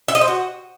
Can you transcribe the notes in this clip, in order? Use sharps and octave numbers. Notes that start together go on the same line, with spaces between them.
E5
D#5
C5
F#4